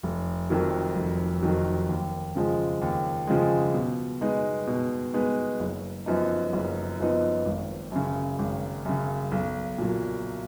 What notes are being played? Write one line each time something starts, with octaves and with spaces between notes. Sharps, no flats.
F1
F2 D#3 F#3
F1
F2 D#3 F#3
D#2
C#3 F3 G#3
D#2
C#3 F3 G#3
B2
G#3 B3 D#4
B2
G#3 B3 D#4
F#1
F#2 F3 B3 D#4
F#1
F#2 F3 B3 D#4
G#1
F#2 C#3
G#1
F#2 C#3
B1
A#2 F#3